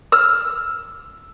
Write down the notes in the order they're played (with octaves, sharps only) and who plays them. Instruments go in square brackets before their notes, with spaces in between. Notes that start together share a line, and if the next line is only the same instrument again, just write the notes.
[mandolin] E6 F6